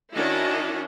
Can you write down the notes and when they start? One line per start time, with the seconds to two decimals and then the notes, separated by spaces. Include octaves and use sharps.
0.15 D#3 C#4 D4 E4 F#4 D#5